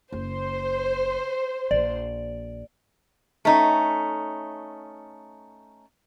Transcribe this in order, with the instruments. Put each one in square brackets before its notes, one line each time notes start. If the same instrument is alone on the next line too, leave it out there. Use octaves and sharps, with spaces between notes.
[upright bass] F#1 [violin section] C5
[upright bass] A#1 [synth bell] D5
[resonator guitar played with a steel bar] A3 C#4 D#4